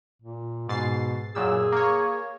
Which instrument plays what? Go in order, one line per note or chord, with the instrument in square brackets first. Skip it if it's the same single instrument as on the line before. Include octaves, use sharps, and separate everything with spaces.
[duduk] A#2
[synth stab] G#2 A6 C7 [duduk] B2
[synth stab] F#2 A#2 E6 [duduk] G#4
[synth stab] A#3 C#5